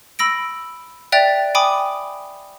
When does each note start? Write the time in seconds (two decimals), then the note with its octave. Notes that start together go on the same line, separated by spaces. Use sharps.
0.19 B5 E6 A#6 D7
1.12 D5 E5 G5 F#6 A6 F7
1.55 G5 G#5 B5 D6 D#6